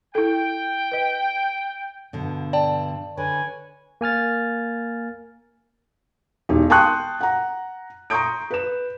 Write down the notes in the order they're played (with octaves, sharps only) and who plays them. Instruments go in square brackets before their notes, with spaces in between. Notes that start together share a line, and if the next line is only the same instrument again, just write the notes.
[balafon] E4 A4 [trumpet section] G5
[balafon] B4 D#5
[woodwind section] G2 [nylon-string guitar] B2 D3
[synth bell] D5 G5 A5
[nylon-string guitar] D3 [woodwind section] B4 C#5 G#5
[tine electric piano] A#3 G#5 F6 A6
[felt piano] E1 D#4 G4
G5 A5 C6 C#6 D#6 F#6
F#5 A#5
A#5 C6 C#6 D#6 G6 D7
B4 E7